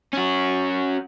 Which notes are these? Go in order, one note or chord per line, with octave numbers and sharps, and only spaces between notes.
C#4 F#4